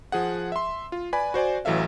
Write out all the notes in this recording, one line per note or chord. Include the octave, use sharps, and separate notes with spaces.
F3 G#4 F#5
E5 C6
F4
B4 D5 G#5 B5
F#4 C5 D5 G#5
A1 E3 F#3 A4 E5 F5